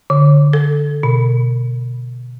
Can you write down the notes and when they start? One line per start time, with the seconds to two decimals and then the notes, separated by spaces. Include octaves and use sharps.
0.10 D3
0.53 A4
1.03 B2